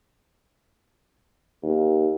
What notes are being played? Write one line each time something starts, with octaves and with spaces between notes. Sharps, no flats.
D#2